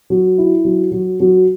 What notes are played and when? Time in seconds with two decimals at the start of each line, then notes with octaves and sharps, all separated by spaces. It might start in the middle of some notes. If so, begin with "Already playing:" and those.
0.10 F#3
0.38 E4
0.65 F#3
0.92 F#3
1.20 F#3